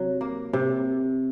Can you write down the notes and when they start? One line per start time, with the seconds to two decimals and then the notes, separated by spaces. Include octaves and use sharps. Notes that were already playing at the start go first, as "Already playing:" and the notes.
Already playing: C3 F#3
0.21 A#3
0.53 C3